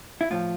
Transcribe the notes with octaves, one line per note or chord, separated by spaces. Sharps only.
E4
A2 F3 F4